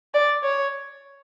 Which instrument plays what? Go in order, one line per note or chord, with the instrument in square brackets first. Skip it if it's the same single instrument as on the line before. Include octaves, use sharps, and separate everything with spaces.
[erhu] D5
C#5